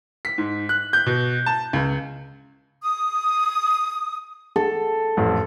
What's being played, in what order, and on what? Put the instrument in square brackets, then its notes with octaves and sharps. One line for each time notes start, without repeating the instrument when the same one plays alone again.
[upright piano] B6
G#2
F#6
G6
B2
A5
C#2
[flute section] D#6
[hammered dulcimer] A4
[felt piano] A1 F2